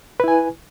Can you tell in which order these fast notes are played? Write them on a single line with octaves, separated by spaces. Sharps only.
B4 E4 G#5